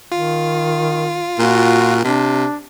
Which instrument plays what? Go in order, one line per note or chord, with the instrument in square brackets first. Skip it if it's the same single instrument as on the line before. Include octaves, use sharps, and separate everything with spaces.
[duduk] D#3 [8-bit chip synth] F4
[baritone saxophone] A#2 [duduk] F#4
[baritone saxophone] C3 [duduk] D4